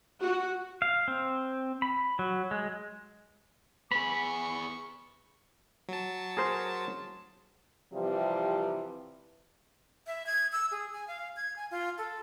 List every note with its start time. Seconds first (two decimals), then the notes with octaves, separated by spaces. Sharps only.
0.22 F#4
0.82 F5
1.08 C4
1.82 B5
2.19 F#3
2.51 G#3
3.91 B3 G#4 B5 C#6
5.89 F#3 A5
6.37 G#4 A#4 C5
7.93 C3 E3 F3 G3
10.07 E5
10.27 G#6
10.52 E6
10.71 G#4
10.93 G#5
11.08 F5
11.37 G#6
11.56 G#5
11.71 F4
11.98 A4